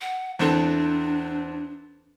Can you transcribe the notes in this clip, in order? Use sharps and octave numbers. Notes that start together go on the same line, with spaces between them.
F#5
E2 C4 D4 A4